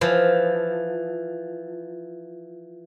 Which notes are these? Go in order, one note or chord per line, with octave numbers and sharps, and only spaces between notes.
E3 F3